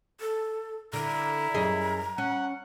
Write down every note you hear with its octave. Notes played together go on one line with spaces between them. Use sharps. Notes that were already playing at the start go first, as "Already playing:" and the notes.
A4
D3 E4 A#5
F#2 G#4 D#5
C#4 F#5